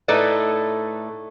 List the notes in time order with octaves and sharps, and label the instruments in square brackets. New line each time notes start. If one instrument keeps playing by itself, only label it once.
[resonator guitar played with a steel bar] A2 A3 D#4 A4 B4 D5